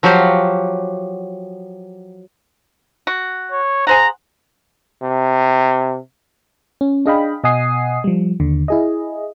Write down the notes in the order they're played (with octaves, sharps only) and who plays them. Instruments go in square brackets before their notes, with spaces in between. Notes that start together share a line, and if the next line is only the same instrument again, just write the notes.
[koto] F3 F#3 F#4 G4 F5
[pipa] F#4
[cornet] C#5
[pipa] G#4 C5 F#5 [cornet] A#5
[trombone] C3
[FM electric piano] C#4
D4 G#4 D#5 F5 G5 B5
B2 D#5 F#5 G#5 D#6 C7
F3 G3
D#2 D3
E4 G#4 D#5